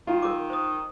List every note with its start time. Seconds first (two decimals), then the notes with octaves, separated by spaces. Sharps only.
0.07 D#3 F4
0.23 A#4 D6
0.50 C5 D#6